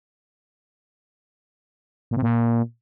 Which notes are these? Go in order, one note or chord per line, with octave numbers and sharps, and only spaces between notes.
A#2
C3
A#2